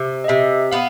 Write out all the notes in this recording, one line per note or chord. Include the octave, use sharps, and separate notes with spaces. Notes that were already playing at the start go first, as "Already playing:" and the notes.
Already playing: C3
D#5
C3 E5
B3 F5